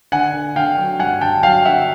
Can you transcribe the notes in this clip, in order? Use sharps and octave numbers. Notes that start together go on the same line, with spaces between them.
D3 F#5 G#5
D3
D3 F5 G5
F#3
G2 F#5 G#5
D3 G5 A5
F#3 F5 G5
D3 E5 F#5